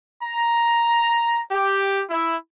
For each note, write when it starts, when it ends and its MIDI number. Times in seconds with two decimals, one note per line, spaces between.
0.23 1.40 82
1.52 2.02 67
2.10 2.35 64